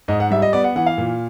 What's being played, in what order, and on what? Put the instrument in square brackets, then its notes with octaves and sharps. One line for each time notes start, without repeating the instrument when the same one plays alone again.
[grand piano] G#2 D#5
F#5
G3 E5
D#5
B3 D5
F#5
E3 F#5
F5
A#2